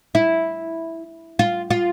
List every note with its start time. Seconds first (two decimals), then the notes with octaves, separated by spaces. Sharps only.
0.15 E4
1.39 F4
1.70 F4